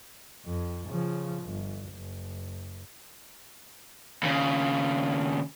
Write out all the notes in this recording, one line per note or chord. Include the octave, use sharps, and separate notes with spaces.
F2
C#3 F3
G1
F#1
D#2 C#3